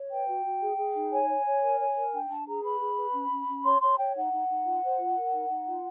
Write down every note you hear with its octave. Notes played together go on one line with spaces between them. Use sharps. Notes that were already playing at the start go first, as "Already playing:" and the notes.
Already playing: C#5
B4 G5
F#4
F#4
G#4
G#4
D#4
C#5 G#5
C#5
C#5
A#4
C#5
A#4
D4 G5
D4 A5
G#4 A#5
B4 B5
G#4
B4
C#4
C#4
C#4
C#5 C6
C#5 C6
C#5 G5
D#4 F#5
D#4
D#4
F4
C5
F4
A#4
D#4
D#4
F4